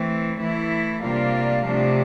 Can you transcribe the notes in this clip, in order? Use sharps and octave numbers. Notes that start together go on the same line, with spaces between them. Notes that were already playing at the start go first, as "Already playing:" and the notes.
Already playing: E3 A3 C4
E3 A3 E4
C3 G3 A#3 D4 F4
C3 F3 A3 D4